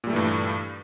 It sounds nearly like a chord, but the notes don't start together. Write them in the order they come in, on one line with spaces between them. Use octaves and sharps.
A#2 G3 A3 E3 G2